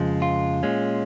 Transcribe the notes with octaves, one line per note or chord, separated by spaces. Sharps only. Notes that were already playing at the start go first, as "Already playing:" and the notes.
Already playing: F2 C#3 F3 G#3
F4
A#2 G#3 C#4